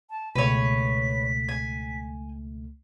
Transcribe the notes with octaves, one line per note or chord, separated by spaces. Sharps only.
A5
C#2 B2 A3 B4 C#5 B6
G#5